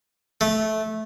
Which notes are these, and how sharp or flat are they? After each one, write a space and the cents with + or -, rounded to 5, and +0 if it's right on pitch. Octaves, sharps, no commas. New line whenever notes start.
A3 -15